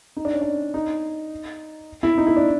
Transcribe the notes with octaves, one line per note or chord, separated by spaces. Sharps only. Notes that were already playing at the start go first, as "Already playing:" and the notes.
D#4
D4
C#4
D4
D#4
E4
D#4
E4
D4